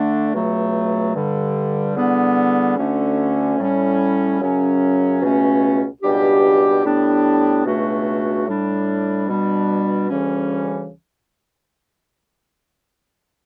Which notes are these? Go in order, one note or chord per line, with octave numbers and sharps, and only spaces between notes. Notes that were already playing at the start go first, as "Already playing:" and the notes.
Already playing: D3 A3 D4
C#2 B2 F#3 A3
G2 D3 G3
E2 D3 G3 B3
D2 D3 A3 C#4
A2 G3 C#4
F#2 C#3 F#3 C#4
C#2 B2 A3 C#4
C#2 B2 G3 D4 G4
A2 G3 B3 D4
C#2 B2 A3 D4 F#4
A2 G3 D4
B2 G3 D4
D2 C#3 E3 G3 C#4